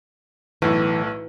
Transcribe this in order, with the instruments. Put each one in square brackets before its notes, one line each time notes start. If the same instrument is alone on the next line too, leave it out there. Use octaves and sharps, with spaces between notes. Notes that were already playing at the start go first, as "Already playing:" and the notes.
[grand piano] B1 A2 [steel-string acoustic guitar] E3